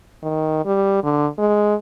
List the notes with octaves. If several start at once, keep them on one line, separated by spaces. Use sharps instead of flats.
D#3
G3
D3
G#3